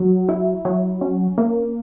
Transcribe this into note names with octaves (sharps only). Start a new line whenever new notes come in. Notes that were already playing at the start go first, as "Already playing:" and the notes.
Already playing: F#3
E4
F#3
C#4
A#3